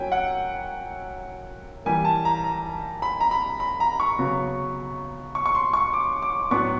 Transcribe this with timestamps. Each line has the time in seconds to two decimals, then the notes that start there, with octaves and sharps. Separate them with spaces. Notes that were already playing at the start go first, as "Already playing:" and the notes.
Already playing: F#3 A#3 C#4 E4 G5 G#5
0.12 F#5
1.85 E3 G3 A#3 G#5
2.05 A5
2.25 A#5
2.44 A#5
3.02 B5
3.20 A#5
3.31 B5
3.60 B5
3.80 A#5
4.00 C#6
4.19 C#3 F#3 B3
5.35 C#6
5.46 C#6
5.55 C6
5.73 C#6
5.93 D6
6.22 D6
6.51 A2 F#3 B3 D4 C#6